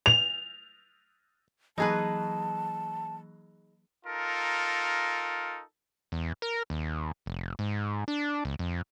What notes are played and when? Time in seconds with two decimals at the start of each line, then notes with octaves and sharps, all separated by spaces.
0.06 F7
1.78 E3 F#3 A#3 D#4 G#4 B4 A5
4.05 D#4 F4 A4 A#4
6.12 E2
6.42 A#4
6.70 D#2
7.26 F1
7.59 G#2
8.08 D4
8.45 C#2
8.59 F2